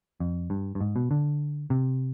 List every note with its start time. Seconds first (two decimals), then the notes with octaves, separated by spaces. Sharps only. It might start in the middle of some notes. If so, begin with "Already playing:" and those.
0.20 F2
0.50 G2
0.75 G2
0.81 G#2
0.96 B2
1.11 D3
1.70 C3